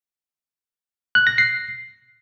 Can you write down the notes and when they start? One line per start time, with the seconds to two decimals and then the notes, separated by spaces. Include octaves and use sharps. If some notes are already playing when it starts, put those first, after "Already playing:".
1.15 F#6
1.27 A#6
1.38 C7